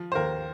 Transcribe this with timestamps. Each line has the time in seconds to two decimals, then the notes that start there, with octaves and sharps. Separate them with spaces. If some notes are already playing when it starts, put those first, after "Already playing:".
Already playing: F3
0.12 C5
0.15 D#2 A#4